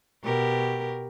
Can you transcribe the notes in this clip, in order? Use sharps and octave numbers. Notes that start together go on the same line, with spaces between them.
B2 G4 A#4